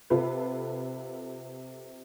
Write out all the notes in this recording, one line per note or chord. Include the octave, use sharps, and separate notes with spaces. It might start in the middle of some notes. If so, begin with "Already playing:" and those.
C3 F4 A4 B4